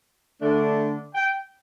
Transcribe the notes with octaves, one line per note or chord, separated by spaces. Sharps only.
D3 A3 D4
G5